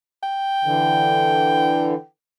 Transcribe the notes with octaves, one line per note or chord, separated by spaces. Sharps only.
G5
D3 E3